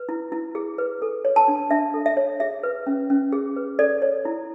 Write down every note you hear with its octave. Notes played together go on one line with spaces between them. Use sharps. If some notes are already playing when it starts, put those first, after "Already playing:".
Already playing: B4
E4
E4
G#4
B4
A4
C#5
A5
D4
D4 E5
A4
E5
C#5
G#4 E5
B4
C#4
C#4
G#4
B4
A4 D5
C#5
E4